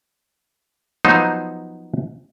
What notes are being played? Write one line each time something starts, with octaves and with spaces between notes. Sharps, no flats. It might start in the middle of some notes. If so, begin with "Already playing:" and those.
F3 F#3 B3 D#4 C5